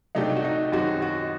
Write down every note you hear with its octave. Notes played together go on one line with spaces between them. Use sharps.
C3 F#3 A3 D4 D#4 G4
F#4
D#4
F#2 D#3 F#3 C4 F#4 G4
F#4